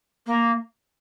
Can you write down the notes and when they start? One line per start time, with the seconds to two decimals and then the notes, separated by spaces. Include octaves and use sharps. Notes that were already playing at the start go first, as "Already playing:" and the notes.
0.26 A#3